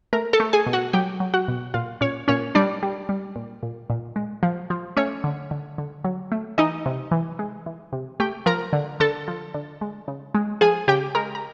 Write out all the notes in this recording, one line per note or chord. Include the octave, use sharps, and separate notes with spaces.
A3 A#4 A#5
A4 A5
A3
G#4 G#5
B2
F#4 F#5
F#3 G4 G5
F#3
F#4 F#5
B2
A#2 F4 F5
A#2 C#4 C#5
A#2 C#4 C#5
G3 D4 D5
G3
G3
A#2
A#2
A#2
G#3
F3
F3
A3 C#4 C#5
D3
D3
D3
F#3
A3
E3 D#4 D#5
C3
E3
G#3
E3
C3
A3 G4 G5
F3 A#4 A#5
D3
D3 A4 A5
F3
D3
G#3
C#3
G#3
F3 G#4 G#5
C#3 G4 G5
G#3 A#4 A#5
A#5